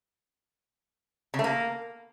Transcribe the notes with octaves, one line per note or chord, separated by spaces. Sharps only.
C#3
A3
A#3